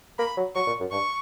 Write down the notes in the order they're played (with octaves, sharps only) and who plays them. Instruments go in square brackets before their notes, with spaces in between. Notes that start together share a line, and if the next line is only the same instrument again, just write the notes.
[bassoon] A#3 [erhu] B5
[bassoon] F#3
[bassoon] F#3 [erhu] C#6
[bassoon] A#2
F#2
[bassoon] G2 [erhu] C#6